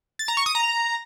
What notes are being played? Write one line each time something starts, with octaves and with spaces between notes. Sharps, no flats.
A6
A#5
C#6
D#6
A#5